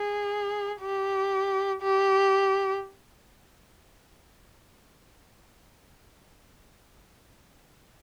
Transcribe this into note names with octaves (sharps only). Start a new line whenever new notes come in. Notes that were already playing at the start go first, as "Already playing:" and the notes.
Already playing: G#4
G4
G4